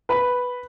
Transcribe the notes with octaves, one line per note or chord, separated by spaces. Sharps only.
B4 B5